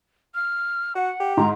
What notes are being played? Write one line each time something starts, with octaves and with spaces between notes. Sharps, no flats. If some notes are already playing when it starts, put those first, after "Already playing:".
F6
F#4 F#5
G4
G#2 A#5